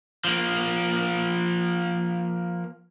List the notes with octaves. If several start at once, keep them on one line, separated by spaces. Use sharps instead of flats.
F3 A#3